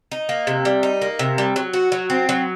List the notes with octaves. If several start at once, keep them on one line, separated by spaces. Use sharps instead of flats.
D#4
A#3
C3
G3
D#4
A#3
C3
G3
F#3
F#4
F#3
C4
F#3